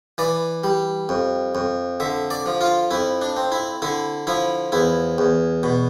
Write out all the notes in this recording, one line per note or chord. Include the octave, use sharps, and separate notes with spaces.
E3 D5
G3
F2
F2
D3 E5
D5
F3
F4
F2 E4
D4
C4
E4
D3 E4
F3 E4
E2 E4
E2
B2